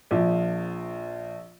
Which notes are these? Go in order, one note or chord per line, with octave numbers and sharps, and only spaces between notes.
A#1 F3